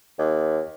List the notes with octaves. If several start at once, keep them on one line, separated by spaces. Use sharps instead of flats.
D#2